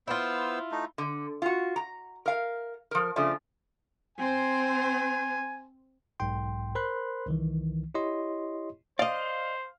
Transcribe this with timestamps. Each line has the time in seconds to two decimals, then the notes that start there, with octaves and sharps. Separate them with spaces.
0.08 B3 E4 F4 C5 E6
0.71 A3 D#4
0.98 D3
1.42 F4 F#4
1.76 A#5
2.26 A#4 F5
2.91 F3 A#4
3.16 C#3 F3 A3 D4
4.18 C4 C5 G#5
6.20 B1 G#2 G5 C6
6.75 A#4 C5 B5 C6 F#6
7.26 C2 D#3 E3
7.95 E4 G4 C#5 D#5 C6
8.99 C5 D5 D#5 F5